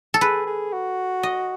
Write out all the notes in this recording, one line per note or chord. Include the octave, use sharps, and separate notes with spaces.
A4
G#4 B4
G#4
F#4
D#5